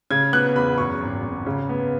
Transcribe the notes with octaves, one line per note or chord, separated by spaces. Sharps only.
C#3 G#6
B3 F#6
E2 B5
F#2 C#6
G#1
G#1
C#3
B3